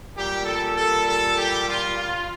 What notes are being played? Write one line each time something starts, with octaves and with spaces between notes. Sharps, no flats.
A#2 G3 G4
A4
A4
A4
G4
F4
F4